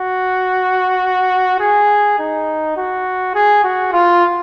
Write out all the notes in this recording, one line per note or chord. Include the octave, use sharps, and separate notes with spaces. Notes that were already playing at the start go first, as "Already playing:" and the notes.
Already playing: F#4
G#4
D#4
F#4
G#4
F#4
F4